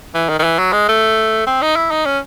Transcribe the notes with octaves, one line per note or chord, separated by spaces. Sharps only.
E3
D#3
D#3
E3
F#3
G#3
A3
C4
D#4
E4
D#4
C#4